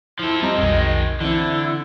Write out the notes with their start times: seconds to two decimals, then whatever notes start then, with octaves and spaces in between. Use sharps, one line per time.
0.19 F3 E4 A4
0.42 G3 C4 D#5 A#5
0.58 B1 F2 D#3 G#3
1.21 D3 E3 C4 E4